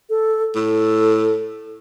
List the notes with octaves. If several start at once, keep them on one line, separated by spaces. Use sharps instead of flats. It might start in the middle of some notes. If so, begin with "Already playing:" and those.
A4
A2 A4